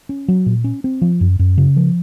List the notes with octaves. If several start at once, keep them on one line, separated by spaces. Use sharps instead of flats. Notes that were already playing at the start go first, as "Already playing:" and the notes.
C#4
F#3
A#2
C#4
C4
F3
F#2
F#2
C#3
F3